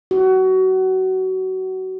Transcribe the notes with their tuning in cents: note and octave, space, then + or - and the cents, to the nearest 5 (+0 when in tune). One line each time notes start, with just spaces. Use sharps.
F#4 +25